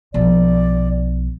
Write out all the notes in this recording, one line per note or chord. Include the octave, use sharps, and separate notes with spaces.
B1 F3 D5